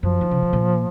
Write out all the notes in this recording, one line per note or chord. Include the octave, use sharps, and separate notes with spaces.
F#2 F3
D#3
C#3
C3
A#2